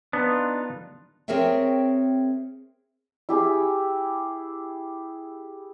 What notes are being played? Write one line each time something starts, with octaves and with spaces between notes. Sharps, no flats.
B3 D4 D#4 F4
C4 G#4 A#4 C#5 E5 G5
E4 G4 G#4